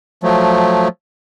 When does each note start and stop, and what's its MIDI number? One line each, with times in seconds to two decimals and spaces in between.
0.23 0.88 53
0.23 0.88 54
0.23 0.88 57